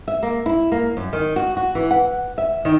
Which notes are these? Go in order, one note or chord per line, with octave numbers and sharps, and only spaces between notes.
E5
A#3
E4
A#3
F#2
D#3
F#4
F#4
E3
F#5
E5
D#3